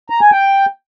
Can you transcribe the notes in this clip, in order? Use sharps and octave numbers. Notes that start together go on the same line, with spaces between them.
A#5
G#5
G5